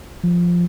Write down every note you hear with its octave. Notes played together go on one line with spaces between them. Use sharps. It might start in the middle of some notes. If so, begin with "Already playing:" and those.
F3